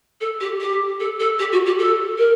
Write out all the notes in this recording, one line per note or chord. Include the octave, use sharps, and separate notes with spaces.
A4
G4
G4
A4
A4
G4
F#4
G4
A4
A#4